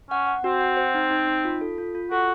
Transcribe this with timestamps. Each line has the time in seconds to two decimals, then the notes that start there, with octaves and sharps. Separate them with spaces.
0.10 C#4 F#5
0.27 F#5
0.44 C4 F#4
0.60 F#5
0.77 C5
0.95 D#4
1.11 D#4
1.27 D#4
1.45 F4
1.61 A4
1.78 F4
1.95 F4
2.11 F#4 A4